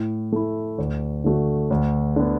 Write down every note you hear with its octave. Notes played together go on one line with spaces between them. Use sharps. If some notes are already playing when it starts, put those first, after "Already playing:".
Already playing: A2
A3 E4
D2
D3 A3 F#4
D2
D3 B3